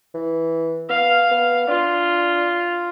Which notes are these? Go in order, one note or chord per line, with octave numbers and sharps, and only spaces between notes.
E3
B3 F5
B3
D4 F4